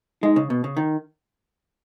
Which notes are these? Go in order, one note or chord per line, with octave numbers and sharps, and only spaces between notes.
G#3 D#4
C#3
B2
C#3
D#3